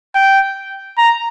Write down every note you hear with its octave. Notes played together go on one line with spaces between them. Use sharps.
G5
A#5